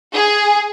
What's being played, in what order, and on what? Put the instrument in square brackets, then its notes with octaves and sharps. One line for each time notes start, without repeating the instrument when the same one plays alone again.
[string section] G#4